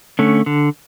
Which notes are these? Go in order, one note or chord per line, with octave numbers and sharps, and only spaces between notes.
D3 A3 C#4
D3